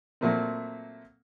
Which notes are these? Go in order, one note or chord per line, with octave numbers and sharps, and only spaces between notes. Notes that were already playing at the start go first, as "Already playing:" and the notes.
A#2 F#3 A3 A#3 C4